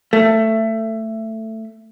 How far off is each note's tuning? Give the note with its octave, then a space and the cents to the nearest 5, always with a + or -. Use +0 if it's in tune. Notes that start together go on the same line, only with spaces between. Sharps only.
A3 +15